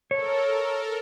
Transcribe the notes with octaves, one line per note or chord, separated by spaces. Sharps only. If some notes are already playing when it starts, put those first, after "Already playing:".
A4 A#4 C#5